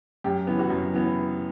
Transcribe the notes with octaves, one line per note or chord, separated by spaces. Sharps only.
F#2 G4
E3 B3
F#4
F#2
E3 B3